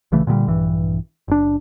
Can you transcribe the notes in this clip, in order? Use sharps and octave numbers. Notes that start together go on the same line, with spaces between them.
A#1 C#3 E3 A3
A#2 D3 F3 G3
A#1 G2 E3
F#1 D4